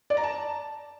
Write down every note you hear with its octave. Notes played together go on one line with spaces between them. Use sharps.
D5
A#5
A5